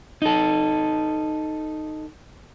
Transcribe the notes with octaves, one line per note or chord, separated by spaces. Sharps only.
D#4 A4